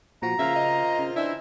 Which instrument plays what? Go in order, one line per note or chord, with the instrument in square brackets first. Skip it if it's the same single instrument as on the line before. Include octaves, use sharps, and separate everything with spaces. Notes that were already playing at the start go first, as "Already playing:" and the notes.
[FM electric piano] A#2 F3 F#4 [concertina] A#5
[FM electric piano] C#3 [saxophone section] A#3 C4 F4 [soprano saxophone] E5
[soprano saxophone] D#5
[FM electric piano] C#3
[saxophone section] E3 C5 E5 [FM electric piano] D4 [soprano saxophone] E4